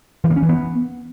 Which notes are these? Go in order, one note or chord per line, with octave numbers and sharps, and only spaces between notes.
E3
A#3
C#4
E3
B3